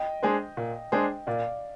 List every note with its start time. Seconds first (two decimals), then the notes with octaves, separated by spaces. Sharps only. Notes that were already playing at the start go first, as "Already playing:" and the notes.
Already playing: D#5 G5
0.23 G#3 D4 G#4 C5
0.57 A#2
0.92 G#3 D4 G#4 C5
1.27 A#2 D5 F5